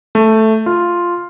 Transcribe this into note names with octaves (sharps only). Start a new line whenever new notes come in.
A3
F4